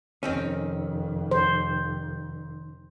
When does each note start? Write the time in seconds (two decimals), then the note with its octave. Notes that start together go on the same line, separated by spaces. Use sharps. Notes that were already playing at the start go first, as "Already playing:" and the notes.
0.23 F1 F2 D#3 C4 C#4
1.31 C5